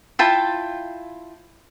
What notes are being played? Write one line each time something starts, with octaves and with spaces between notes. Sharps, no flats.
E4 F4 G5 A5